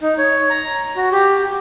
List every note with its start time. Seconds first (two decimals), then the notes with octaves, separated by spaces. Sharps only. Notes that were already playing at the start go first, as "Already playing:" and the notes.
0.01 D#4
0.18 C#5
0.50 A#5
0.96 F#4
1.12 G4